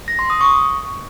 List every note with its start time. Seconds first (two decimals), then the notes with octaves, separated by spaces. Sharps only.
0.08 A#6
0.19 C6
0.30 D#6
0.41 C#6